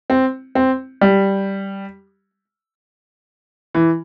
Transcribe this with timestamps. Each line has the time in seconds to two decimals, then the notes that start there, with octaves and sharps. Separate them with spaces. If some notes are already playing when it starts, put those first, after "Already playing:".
0.10 C4
0.55 C4
1.01 G3
3.74 E3